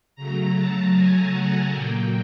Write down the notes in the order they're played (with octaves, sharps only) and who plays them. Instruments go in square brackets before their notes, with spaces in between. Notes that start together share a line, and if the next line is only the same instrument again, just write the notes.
[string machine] C#3 F#3 A3 A#5
A5
G#5
F#5
A#2 F#3 A#3 G5